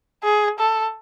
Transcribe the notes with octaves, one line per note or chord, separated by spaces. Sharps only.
G#4
A4